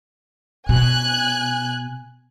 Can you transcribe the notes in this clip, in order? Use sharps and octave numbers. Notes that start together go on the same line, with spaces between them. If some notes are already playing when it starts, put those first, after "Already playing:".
B2 G#5 F#6